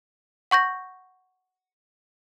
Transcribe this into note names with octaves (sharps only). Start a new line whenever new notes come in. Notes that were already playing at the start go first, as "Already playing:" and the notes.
F#5 C#6 G6 A#6